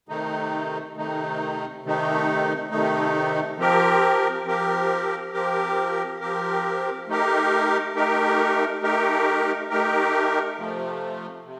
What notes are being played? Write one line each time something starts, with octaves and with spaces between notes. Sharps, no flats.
C3 D#3 A3 D#4
C3 D#3 A3 D#4
C3 D#3 A3 D#4
C3 D#3 A3 D#4
F3 C4 G4 A#4
F3 C4 G4 A#4
F3 C4 G4 A#4
F3 C4 G4 A#4
A3 D#4 G4 A#4
A3 D#4 G4 A#4
A3 D#4 G4 A#4
A3 D#4 G4 A#4
C3 F3 A3
C3